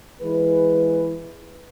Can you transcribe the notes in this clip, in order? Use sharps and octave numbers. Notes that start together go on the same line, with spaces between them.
E3 G#3 B4